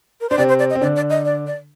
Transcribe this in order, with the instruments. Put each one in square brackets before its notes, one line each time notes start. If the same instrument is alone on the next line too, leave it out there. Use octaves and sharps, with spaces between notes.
[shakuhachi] A#4
[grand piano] D4 [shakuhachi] C5
[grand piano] C3 C4 [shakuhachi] D5
[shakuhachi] C5
D5
D#5
[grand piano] C4
[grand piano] D3 D4 [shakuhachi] D5
[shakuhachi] D5
D#5
D5
D5